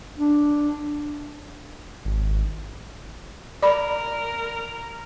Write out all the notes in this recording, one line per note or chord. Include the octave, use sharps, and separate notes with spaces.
D4
G#1
A#4 D5 B5